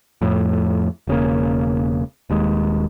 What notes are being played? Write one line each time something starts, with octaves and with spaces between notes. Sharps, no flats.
F2 A2
E1 C#3 A#3
D#1 D#2 G#3